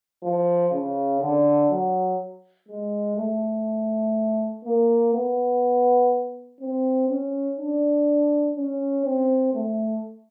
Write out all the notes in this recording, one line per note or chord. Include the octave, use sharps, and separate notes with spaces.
F3
C#3
D3
F#3
G#3
A3
A#3
B3
C4
C#4
D4
C#4
C4
A3